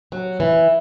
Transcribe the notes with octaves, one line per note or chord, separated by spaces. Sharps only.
F#3
E3